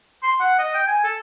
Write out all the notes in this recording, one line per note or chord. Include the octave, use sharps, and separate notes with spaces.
C6
F#5
D#5
G5
G#5
A4